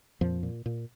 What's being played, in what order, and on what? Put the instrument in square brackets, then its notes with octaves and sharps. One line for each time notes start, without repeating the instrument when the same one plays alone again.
[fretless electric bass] F2 A#2 F3
A#2
A#2